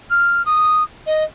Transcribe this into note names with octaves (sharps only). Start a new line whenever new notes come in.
F6
D#6
D#5